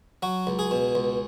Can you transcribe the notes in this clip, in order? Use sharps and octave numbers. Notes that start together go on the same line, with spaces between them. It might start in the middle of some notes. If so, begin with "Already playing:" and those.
F#3 F#4
C#2
G#4
B2
C#2